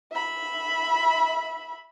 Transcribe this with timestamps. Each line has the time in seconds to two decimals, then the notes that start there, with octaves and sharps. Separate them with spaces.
0.11 E5 B5